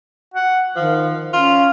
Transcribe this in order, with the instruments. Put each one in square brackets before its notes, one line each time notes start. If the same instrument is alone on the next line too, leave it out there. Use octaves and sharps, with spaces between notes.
[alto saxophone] F#5
[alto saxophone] D#3 [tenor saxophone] F3
[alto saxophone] C#4 [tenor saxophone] F4